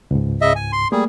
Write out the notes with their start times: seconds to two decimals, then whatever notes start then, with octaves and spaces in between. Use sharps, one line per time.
0.11 C#2 G#2
0.41 C#3 D#5 E5
0.55 G#5
0.73 C6
0.92 G3 A3 A#3 G#4